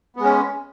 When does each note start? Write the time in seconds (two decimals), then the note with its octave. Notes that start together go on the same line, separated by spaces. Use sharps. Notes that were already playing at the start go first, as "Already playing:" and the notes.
0.16 B3
0.20 G#3
0.24 C#4